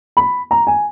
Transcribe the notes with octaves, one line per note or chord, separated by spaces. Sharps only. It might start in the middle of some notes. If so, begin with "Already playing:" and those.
B5
A#5
G#5